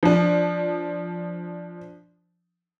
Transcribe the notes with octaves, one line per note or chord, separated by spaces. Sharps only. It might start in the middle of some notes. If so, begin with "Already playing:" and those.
F3 D4